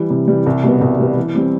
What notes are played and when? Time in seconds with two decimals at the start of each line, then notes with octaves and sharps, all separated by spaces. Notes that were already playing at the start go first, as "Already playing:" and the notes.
Already playing: E3 G3
0.10 C3
0.28 E3 G3
0.46 C2
0.63 B2 G3 B3
0.81 C2
0.99 B2 G3 B3
1.16 E3
1.35 G3 C4